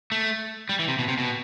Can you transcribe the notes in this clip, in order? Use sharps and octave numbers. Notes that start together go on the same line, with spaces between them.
A3
G3
E3
C3
B2
C3
B2